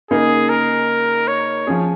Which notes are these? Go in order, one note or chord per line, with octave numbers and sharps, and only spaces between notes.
C#3 A#3 D#4 G#4
A#4
C#5
F3 C#4 G#4